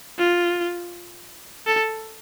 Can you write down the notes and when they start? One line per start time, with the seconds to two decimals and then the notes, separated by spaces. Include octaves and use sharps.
0.18 F4
1.67 A4